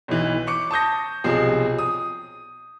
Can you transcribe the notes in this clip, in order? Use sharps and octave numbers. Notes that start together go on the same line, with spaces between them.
B1 E3
C#6 D6 C#7
A5 D#6 G6 A#6
B1 C3 F3 G#4
D#6